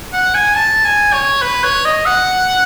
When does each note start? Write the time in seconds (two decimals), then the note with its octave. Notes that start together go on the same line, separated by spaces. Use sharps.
0.13 F#5
0.34 G#5
0.56 A5
0.85 G#5
1.13 C#5
1.42 B4
1.64 C#5
1.85 D#5
2.06 F#5